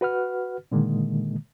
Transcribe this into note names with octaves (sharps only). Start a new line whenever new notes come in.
F#4 B4 F#5 F6
A#2 D3 D#3 G#3 A#3